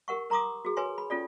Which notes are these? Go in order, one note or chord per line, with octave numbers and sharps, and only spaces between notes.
G4 A#4 F#5 C#6
A#4 A#5 C6 D6 D#6
F#4 G#4
B4 C#5 G#5 C6
B5
C#4 F4 A4 D5